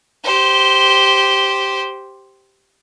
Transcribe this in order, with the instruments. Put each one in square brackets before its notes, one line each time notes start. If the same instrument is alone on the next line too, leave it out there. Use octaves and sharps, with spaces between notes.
[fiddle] G4 C5